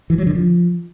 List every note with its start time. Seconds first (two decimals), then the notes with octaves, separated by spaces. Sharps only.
0.10 E3
0.18 F#3
0.27 D3
0.35 F3